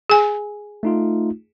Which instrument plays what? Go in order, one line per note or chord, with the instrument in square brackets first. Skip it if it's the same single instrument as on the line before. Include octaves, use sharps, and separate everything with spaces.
[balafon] G#4 G#5
[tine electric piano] A3 D#4 F4